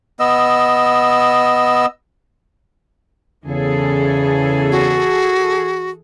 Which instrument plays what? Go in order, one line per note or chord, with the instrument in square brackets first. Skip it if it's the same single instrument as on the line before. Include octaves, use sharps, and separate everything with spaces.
[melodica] B3 D#5 E6
[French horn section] E2 C#3 [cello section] E3 G#4 A4
[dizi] F#4